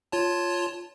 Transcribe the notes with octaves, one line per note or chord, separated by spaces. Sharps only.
F4 C#5 A5